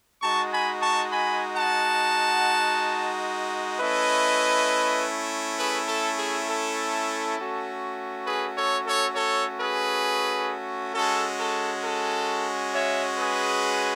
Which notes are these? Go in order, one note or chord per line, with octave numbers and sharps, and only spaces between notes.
G#3 D#4 F#4 A5 C#6
G#5 B5
A5 C#6
G#5 B5
F#5 A5
A3 C#4 E4 B4 D#5
G#4 B4
A4
G#4
A4
A3 C#4 F#4
G#4 B4
A4 C#5
A4 C#5
A4 C#5
G#4 B4
G#3 C#4 F#4 A4
A4
A4
C#5 E5
G#4 B4